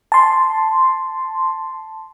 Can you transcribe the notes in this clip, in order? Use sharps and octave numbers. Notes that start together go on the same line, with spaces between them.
A5 C6